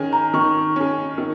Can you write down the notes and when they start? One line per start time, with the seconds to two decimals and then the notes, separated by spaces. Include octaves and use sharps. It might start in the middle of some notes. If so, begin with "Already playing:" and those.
Already playing: D#3 C#4 G#4
0.13 A#5
0.34 D#3 C#6
0.76 C#4 G#4
1.18 D#3